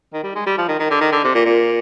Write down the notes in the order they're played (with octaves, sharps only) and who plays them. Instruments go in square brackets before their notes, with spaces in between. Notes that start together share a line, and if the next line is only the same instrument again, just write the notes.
[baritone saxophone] D#3
G3
G#3
G3
F3
D#3
D#3
D3
D#3
D3
C3
A#2
A#2